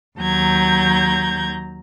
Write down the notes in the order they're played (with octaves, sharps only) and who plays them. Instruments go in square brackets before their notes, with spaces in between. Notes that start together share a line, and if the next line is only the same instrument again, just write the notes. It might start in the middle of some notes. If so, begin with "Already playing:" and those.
[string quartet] D#2 F#3 A#5 G6 G#6